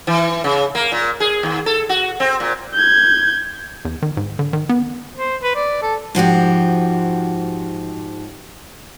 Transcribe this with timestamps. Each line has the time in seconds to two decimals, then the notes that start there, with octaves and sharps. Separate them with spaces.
0.07 E3
0.44 C#3
0.75 A#3
0.92 A#2
1.20 G#4
1.43 D#2
1.66 A4
1.89 F#4
2.20 C4
2.40 A#2
2.74 G6 G#6
3.85 E2
4.02 D#3
4.17 G#2
4.39 D3
4.53 D#3
4.69 B3
5.15 C5
5.42 B4
5.56 D5
5.82 A4
6.15 G#2 F3 F#4 G4